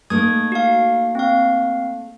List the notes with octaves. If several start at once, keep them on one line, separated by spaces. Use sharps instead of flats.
A3 A#3 D#4 D#6 G#6
F#4 F5
C4 F5